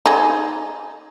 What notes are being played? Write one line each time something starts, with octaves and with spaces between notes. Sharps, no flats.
D#4 G#4